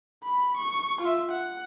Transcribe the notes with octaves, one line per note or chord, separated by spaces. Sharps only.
B5
C#6
F4 E5
F#5